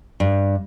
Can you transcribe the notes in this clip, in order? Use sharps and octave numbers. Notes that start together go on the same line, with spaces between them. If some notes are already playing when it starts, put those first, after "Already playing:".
G2